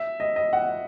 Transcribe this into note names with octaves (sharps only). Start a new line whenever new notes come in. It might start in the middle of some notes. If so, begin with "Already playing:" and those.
Already playing: E5
D#5
D#5
F#5